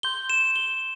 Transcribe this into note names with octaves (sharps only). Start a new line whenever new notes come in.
C6 G6 G7
E7
G7